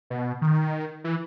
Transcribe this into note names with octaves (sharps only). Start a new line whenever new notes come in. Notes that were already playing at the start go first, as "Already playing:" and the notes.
B2
D#3
E3